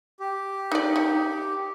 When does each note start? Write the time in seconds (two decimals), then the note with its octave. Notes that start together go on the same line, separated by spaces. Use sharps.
0.20 G4
0.72 D#4 D5
0.96 D#4